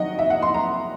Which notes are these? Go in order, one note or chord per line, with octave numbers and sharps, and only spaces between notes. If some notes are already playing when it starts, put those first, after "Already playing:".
Already playing: D#3 F#3 D#5 F#5 G5
E5
F#5
C6
A#5